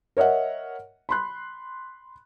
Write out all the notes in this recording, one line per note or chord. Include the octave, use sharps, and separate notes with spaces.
A#4 C#5 D#5 E5 F#5
B5 C6 F#6